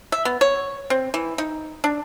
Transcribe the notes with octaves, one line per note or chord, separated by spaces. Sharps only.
E5
B3
C#5
C4
E3
D#4
D4